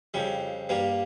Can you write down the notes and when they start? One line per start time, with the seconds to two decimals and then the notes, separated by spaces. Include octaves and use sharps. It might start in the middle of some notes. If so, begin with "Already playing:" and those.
0.14 F2 C#3 G3
0.69 G2 G3 A#3